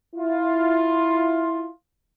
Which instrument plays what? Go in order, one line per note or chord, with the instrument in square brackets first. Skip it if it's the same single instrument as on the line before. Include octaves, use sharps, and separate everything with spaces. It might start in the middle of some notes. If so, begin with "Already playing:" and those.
[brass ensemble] E4 F4